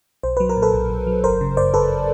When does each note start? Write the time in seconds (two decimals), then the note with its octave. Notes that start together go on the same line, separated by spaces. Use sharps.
0.23 B1 C5
0.37 F#3 B4
0.49 A#4
0.57 A#2
0.62 A4 B4
0.73 B1
0.90 B1
1.07 F#3
1.24 G1 A#4 C5
1.41 C#3
1.57 F#2 C5 D5
1.74 G1 A4 B4